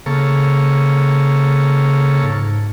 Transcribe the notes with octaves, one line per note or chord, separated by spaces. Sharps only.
C#3 A#3 A4 C#5
G#2